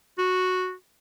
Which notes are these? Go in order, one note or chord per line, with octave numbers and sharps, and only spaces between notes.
F#4